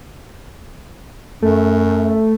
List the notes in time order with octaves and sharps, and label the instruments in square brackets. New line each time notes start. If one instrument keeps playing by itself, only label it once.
[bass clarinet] F#2 [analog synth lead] A3